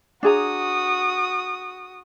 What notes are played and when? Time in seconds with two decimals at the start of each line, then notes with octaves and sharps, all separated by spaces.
0.23 D4 F#4 G#4 A#5 D#6